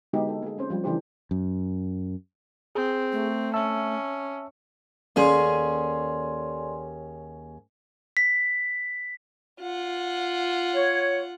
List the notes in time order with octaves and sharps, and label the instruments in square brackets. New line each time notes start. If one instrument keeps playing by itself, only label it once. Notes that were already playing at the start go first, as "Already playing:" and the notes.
[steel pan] D3 G#3 B3 D#4 F#4 G4
A4
A#3 G#4
C4 C#4 C5
F3 G3
C#3 E3 A3 D4 G4 C5
[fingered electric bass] F#2
[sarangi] C4 [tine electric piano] G#4
[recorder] A3
[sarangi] C#4 [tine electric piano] E5 A5 E6
[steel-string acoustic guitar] D#2 C#4 G#4 [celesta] A4 D5 C6
[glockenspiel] B6
[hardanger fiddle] F4 F#5
[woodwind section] C#5